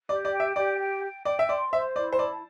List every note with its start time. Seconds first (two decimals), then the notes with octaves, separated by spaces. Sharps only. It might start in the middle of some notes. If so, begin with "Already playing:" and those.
0.09 G4 D5
0.25 D5
0.32 G5
0.40 E5
0.56 G4 D5
0.79 G5
1.03 G5
1.25 D5 G5
1.39 E5
1.49 D5 C6
1.72 C5 E5
1.96 E4 D5
2.13 C5
2.19 D5 A5